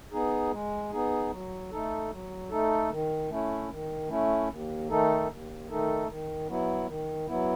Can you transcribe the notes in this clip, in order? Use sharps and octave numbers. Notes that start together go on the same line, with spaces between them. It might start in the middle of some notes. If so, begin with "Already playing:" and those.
B3 D#4 G#4
G#3
B3 D#4 G#4
F#3
A3 D#4 A4
F#3
A3 D#4 A4
D#3
A3 C#4 E4
D#3
A3 C#4 E4
D#2
D#3 A3 D#4 A4
D#2
D#3 A3 D#4 A4
D#3
F#3 B3 E4
D#3
F#3 B3 E4